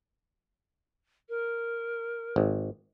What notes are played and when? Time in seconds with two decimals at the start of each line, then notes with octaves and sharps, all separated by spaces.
1.29 A#4
2.36 G#1